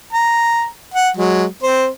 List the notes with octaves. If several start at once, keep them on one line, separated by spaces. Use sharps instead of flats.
A#5
F#5
F#3 G#3
C4 C5